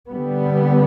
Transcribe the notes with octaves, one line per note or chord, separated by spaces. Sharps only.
D3 G3 B3